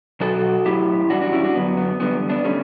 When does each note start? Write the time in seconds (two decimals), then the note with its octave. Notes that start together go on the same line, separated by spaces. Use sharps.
0.20 B2 F#3 F#4 A4
0.65 A2 F#3 E4 G4
1.10 F#2 E3 G3 D4 F#4
1.21 D4 F#4
1.32 C#4 E4
1.44 D4 F#4
1.55 F#2 D3 F#3 B3
1.77 B3
2.00 E2 D3 G3 B3
2.29 B3 D4
2.44 D3 G3 A3 C#4